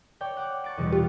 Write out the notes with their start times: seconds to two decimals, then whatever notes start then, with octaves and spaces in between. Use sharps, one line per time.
0.21 C#5 D5 G5
0.37 F#5 D6
0.64 C#6 A6 D7
0.78 E2 B2 G3
0.93 F4 G4